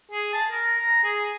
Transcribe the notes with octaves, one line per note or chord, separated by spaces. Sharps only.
G#4
A5
A#4
A#5
G#4